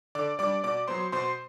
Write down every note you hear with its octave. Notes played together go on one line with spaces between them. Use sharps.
D3 D5 D6
G3 D4 D5 D6
B2 D5 D6
F#3 B3 C5 C6
B2 C5 C6